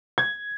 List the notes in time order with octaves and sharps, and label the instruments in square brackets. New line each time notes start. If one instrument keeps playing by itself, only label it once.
[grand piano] G#6